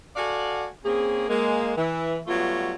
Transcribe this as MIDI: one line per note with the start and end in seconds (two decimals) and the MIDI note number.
0.16 0.68 66
0.16 0.68 69
0.16 0.68 74
0.16 0.68 77
0.16 0.68 78
0.16 0.68 80
0.84 1.27 58
0.84 1.27 60
0.84 1.27 61
0.84 1.27 68
1.29 1.71 56
1.29 1.71 58
1.77 2.20 52
2.27 2.75 54
2.27 2.75 55
2.27 2.75 57
2.27 2.75 59
2.27 2.75 65